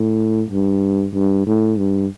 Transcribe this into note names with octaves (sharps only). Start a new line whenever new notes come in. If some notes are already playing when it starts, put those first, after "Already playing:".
Already playing: A2
G2
G2
A2
G2